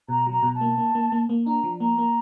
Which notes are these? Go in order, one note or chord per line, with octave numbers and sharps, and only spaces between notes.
B2 A#5
F#3 A#5
B2
A5
A#3
A#3
A#3
A#3
A#3
D4 A#5
F3
A#3 A#5
A#3